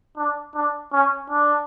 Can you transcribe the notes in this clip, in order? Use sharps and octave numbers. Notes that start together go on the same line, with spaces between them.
D4
D4
C#4
D4